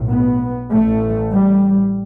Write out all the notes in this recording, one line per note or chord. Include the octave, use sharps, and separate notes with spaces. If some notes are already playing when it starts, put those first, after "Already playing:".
Already playing: B1 A2
B3
A1 A2 A3
G3